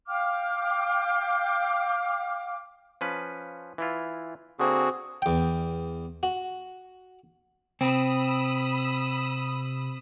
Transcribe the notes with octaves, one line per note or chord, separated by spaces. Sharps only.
F5 G5 D6 F6
F3 C#4 B4
E3 E4 F4
D3 A#3 C4 F#4 G#4
E2 G5
F#4
C3 C4 B5 D#6 E6